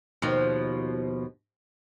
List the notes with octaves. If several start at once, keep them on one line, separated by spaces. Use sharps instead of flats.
D#2 B2 F3